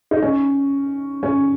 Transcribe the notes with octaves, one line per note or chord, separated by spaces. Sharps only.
D#4
C#4
C#4